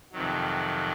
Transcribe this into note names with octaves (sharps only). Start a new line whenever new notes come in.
F2 C3 D#3 F#3